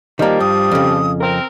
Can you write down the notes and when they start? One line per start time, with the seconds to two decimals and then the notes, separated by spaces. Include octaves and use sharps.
0.19 D#3 F3 G3 A#3
0.40 G2 D#6
0.72 F2 C#3
1.21 C4 A#4